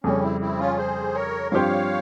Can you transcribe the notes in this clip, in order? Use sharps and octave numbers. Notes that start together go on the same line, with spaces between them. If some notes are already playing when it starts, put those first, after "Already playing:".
F2 C#3 G3 C#4
C4 E4
C4 E4
C#4 F4
G#4 C5
A#4 C#5
G2 F3 C4 G4 C5 C#5 F5